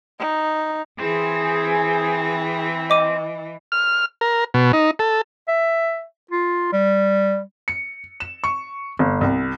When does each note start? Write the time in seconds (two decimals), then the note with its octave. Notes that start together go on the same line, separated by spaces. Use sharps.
0.19 D#4
1.00 E3 C4 G#4 C5
2.90 D#5 D6 D#7
3.72 F6
4.21 A#4
4.54 B2
4.73 D#4
4.99 A4
5.48 E5
6.31 F4
6.72 G3
7.68 C#7
8.20 E7
8.44 C#6
8.99 G1
9.21 C2